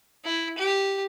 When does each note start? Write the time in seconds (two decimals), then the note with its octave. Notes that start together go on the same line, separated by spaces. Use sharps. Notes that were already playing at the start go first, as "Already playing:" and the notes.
0.25 E4
0.58 G4